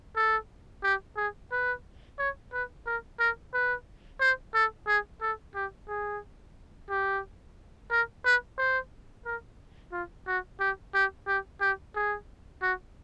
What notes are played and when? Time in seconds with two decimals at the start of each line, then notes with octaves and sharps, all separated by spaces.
0.16 A4
0.83 G4
1.17 G#4
1.52 B4
2.19 C#5
2.53 B4
2.86 A#4
3.20 A#4
3.54 B4
4.21 C5
4.54 A4
4.88 G#4
5.22 A4
5.55 G4
5.88 G#4
6.90 G4
7.91 A#4
8.25 B4
8.58 C5
9.25 A#4
9.92 F4
10.27 F#4
10.60 G4
10.94 G4
11.28 G4
11.61 G4
11.96 G#4
12.62 F#4